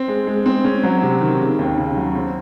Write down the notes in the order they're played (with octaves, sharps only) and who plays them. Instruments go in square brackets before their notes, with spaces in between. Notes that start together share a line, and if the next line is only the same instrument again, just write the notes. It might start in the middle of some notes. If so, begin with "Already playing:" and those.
Already playing: [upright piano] C4
G#3
G#3
C4
C#4
F#3
C3
D#3
C#3
D#2
C#3
F#3
C4